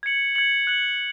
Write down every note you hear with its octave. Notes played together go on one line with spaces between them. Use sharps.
G#6 C#7 F#7
G#6 C#7 F#7
F#6 C#7 F#7